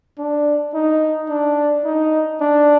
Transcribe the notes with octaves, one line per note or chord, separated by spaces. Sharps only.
D4
D#4
D4
D#4
D4